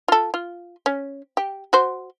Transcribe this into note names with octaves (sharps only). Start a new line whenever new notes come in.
F4 A4
F4
C#4
G4
F#4 C5